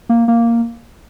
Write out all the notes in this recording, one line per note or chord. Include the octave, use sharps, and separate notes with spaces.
A#3
A#3